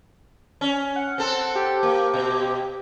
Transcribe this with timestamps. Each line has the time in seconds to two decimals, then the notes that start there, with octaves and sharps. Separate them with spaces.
0.61 C#4
0.96 F#5
1.18 C4 A4
1.56 G4
1.83 A#3
2.14 B2